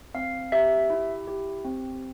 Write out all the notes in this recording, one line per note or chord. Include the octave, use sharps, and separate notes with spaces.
C4 F5
G4 E5
E4
G4
C4